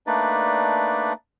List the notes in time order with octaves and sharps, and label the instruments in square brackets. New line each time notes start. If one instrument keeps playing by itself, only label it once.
[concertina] A3 A#3 D4 D#4 B4 D5